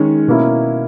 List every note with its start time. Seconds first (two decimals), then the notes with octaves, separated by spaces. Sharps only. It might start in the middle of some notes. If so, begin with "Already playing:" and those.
Already playing: D#3 G#3 C#4
0.28 B2 A#3 C#4 E4